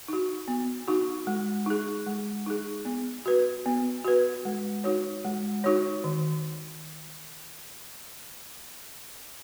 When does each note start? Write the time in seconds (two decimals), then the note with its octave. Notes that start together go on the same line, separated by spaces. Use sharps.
0.08 D#4 F#4
0.48 B3
0.88 D#4 F#4
1.27 G#3
1.66 D#4 G#4
2.06 G#3
2.46 D#4 G#4
2.85 B3
3.26 F#4 B4
3.66 B3
4.04 F#4 B4
4.45 G#3
4.84 D#4 F#4 C#5
5.25 G#3
5.64 D#4 F#4 C#5
6.04 D#3